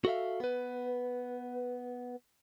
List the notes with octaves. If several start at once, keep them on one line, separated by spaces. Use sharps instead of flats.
F#4 A4 E5 F5
B3 B4